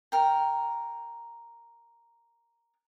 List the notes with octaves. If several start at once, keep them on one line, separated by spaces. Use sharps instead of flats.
A#4 G5